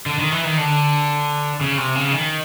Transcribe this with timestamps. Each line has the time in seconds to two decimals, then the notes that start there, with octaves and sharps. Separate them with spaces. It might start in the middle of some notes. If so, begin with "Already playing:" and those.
0.06 D3
0.19 D#3
0.32 E3
0.45 D#3
0.58 D3
1.61 C#3
1.78 C3
1.95 C#3
2.13 D#3